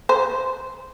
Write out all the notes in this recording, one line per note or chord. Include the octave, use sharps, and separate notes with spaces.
C5